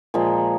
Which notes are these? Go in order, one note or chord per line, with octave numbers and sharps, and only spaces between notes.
A#2 F3 G#3